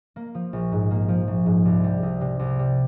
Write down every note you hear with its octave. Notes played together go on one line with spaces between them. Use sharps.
A#3
F3
A#1
G#2
A#3
F3
A#1
G#2
C2
G3
C2
C3
C2
G3